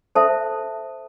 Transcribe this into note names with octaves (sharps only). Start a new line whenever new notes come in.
A4 C5 E5 A5